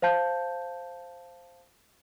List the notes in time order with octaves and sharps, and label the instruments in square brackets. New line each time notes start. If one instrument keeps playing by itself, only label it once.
[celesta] C5 F5 A5 G6